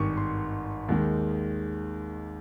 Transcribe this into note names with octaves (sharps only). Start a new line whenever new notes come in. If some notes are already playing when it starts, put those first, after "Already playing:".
Already playing: G#1 G2 D#3 C#6
C6
D#2 D#3 G#3